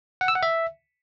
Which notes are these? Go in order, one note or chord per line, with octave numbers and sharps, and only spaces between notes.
F#5
E6
F#5
E5